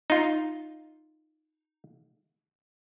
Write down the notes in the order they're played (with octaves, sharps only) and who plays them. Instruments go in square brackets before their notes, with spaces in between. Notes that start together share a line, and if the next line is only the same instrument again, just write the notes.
[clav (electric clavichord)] D#4 F4